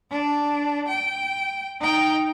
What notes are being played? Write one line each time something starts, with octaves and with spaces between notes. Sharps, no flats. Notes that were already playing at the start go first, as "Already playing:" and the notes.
D4
G5
D#4 G5